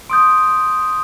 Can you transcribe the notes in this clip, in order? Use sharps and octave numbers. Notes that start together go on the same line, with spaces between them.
C6 D#6 G6 D7